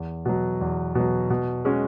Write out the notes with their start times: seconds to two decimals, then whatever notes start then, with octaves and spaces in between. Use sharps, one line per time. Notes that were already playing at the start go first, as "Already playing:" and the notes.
Already playing: E2
0.25 B2 F#3
0.61 E2
0.95 B2 F#3
1.30 B2
1.65 G#3 C#4 F#4